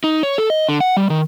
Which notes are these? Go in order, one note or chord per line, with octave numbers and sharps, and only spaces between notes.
D#4
C#5
A4
D#5
D3
F#5
G3
D#3